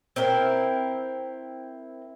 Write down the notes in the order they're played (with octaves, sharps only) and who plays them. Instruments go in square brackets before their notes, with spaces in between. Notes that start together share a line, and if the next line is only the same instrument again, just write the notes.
[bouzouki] C4 E4 A#4